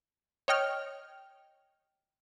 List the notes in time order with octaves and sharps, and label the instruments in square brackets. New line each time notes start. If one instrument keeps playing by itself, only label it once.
[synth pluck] C#5 D#5 G5 F6